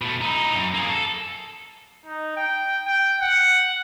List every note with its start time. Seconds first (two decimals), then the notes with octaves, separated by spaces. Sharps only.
0.01 B2 A3
0.21 D#4 E4
0.54 F#2
0.74 A#3 G#4
0.90 A4
2.06 D#4
2.37 G5
2.86 G5
3.22 F#5